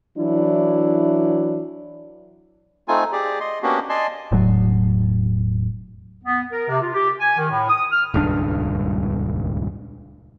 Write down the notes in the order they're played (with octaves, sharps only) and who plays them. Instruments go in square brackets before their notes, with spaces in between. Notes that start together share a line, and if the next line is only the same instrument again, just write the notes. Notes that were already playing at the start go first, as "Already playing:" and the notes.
[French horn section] E3 F#3 D4 E4
[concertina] A3 C4 D#4 F4 G#5
G4 G#4 D5
D#5 C6
A#3 B3 C#4 D4 F#4 G4
D5 D#5 G#5 A5 C6
[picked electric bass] E1 A2 F#3
[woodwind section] B3
A#4
C3
F4
G4
G#5
D#3
A2
D#6
F6
[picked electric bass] D#1 C#2 G2 D4